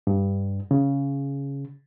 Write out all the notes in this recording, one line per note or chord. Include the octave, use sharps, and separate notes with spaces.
G2
C#3